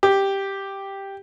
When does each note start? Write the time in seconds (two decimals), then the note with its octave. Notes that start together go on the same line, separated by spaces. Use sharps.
0.03 G4